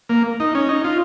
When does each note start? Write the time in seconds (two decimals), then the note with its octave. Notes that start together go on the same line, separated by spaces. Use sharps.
0.09 A#3
0.40 D#4
0.55 C#4
0.69 D#4
0.84 F4